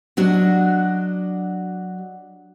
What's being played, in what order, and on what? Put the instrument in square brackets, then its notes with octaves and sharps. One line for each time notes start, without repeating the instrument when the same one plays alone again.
[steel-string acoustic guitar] F#3 D4 F#4 D#5